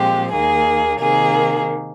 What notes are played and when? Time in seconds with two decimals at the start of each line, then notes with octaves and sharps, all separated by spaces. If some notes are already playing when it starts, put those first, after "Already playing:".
Already playing: A#2 F3 G#3 C4 G4
0.33 D#2 D#3 A#3 G#4
1.00 C3 D#3 A#3 G#4